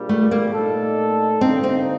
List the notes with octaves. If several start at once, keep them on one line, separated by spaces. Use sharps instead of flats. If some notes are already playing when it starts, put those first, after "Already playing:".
Already playing: A#1 A#2 G3
A3
A#3
A#2 A3 D#4 A4
G2 D3 G3 A#3 C4 D#4
C4